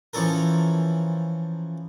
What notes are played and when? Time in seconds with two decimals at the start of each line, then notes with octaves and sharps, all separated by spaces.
0.13 E3 F3 C#4 A4 A#4